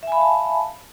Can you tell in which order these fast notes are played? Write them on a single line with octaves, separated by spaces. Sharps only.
E5 G#5 B5 F5 A5